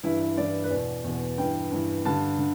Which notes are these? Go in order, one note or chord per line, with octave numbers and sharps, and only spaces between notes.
G2 E3 E4
E4
G2 E3 D5
B4
E2 B2 D5
E2 B2
G2 E3 G5
G2 E3
G2 D3 A5
D3